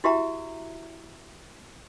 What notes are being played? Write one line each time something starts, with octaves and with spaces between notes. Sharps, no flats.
E4 F#4 G4 E5 A#5